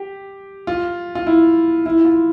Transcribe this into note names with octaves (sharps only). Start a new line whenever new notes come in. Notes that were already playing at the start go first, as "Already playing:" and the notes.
Already playing: G4
F4
F4
E4
E4
F4